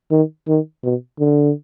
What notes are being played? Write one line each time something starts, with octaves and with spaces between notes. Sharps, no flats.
D#3
D#3
B2
D3